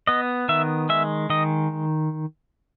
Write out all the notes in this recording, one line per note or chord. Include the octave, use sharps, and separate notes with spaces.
B3 D#5
D#3 E5
G#3 E5
D#3 D#5